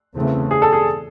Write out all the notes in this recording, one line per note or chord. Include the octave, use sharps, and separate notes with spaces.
E2 C#3 E3 A3 C4
G#4
A4
G#4